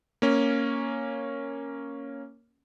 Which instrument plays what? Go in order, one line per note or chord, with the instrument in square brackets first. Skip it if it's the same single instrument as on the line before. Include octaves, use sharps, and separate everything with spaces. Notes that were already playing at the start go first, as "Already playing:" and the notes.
[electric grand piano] A#3 C#4